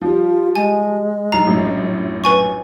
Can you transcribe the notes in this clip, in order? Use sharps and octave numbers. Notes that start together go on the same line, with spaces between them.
F3 G3 F4
G#3 G#5
B1 A#5 C7
A#1 F#2 A2
B4 G#5 C#6